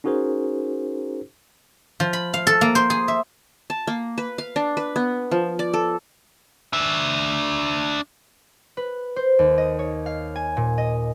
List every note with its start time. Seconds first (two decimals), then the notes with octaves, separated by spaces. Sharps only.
0.04 C#4 D#4 F#4 G#4 A#4 C5
2.00 F3
2.13 B5
2.34 F5
2.47 A4
2.61 A#3
2.75 C5
2.90 G#4
3.08 E5
3.70 A5
3.87 A#3
4.18 B4
4.38 F5
4.56 D4
4.77 B4
4.96 B3
5.31 F3
5.59 D5
5.73 A4
6.73 D4 E5
8.77 B4
9.16 C5
9.39 D#2
9.58 D#5
9.79 C#5
10.06 F5
10.36 G#5
10.57 A#2
10.78 D#5